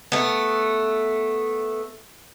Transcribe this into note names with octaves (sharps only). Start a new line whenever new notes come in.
A3 B3